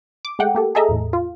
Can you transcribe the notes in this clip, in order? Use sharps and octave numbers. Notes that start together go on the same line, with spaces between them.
D6
G#3 A3 F#5 G5
A#3 G4 A4
G#4 A4 D#5 E5 A#5
E2 A2
F4